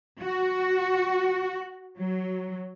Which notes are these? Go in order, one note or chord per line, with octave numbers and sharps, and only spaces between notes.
F#4
F#3